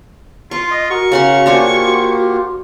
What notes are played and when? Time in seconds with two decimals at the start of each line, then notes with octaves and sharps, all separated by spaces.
0.51 F4 C6 C#6
0.71 D#5
0.90 F#4 A#4 C#6
1.12 C#3 F#5 C6
1.46 A#3 D4 F4 G4 C5 G#5